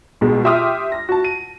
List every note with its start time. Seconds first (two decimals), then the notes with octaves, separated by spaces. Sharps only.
0.21 C2 B2 G#3
0.44 G4 E5 C6 D6 D#6 F6
0.92 A#6
1.09 F#4 A5
1.25 D#7